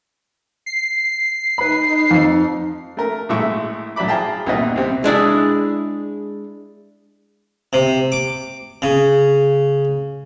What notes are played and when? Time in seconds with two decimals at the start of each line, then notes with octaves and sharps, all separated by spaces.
0.66 C7
1.58 D#4 B4 B5
2.11 F2
2.97 A3 A#4
3.29 A#1 A2 G#3 E4 E5 C#6
3.96 A2 F#3 D5 E5 B5 D6
4.08 G#4 F5 G5 A5 A#5
4.46 C2 G2 A#2 B3 D#5 E5
4.76 C2 C3
5.04 G#3 D4 E4 G#4
7.73 C3
8.12 D6
8.82 C#3